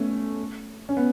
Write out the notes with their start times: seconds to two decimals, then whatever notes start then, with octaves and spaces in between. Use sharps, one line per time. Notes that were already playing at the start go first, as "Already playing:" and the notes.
Already playing: A3 B3 C#4
0.89 C#4
0.97 B3